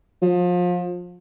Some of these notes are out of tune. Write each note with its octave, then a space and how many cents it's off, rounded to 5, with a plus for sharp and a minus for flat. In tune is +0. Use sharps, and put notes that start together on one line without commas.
F3 +30